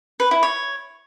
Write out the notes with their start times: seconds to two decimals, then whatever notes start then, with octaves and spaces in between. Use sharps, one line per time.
0.20 B4
0.31 E4
0.43 C#5